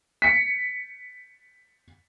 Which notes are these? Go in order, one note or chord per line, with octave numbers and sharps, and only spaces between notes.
B6 C#7